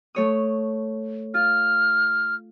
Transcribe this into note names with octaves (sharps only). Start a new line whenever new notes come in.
A3 C#5 D#6
F4 F6